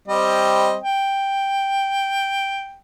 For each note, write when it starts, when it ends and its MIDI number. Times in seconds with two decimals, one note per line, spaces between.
0.08 0.76 55
0.08 0.76 60
0.08 0.76 75
0.84 2.77 79